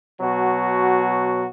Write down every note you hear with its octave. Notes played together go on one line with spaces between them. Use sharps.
B2 F#3 F#4